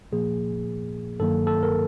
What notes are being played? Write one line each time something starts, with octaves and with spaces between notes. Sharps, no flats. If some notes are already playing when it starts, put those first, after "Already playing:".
A#2 F3 A#3 G#4
G2 D#3 F#3 A#3 A4
A4
A#4